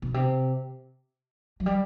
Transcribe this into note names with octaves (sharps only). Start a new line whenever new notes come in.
B2
C3
F#3
G3